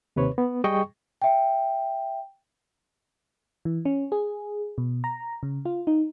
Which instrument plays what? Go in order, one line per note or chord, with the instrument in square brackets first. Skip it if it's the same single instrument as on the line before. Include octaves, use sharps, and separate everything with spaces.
[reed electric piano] D#2 C3 B4 C#5
B3
G3 G#4 D#5 G5 C#6
[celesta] E5 G5
[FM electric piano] E3
C#4
G#4
B2
A#5
C#3
F4
D#4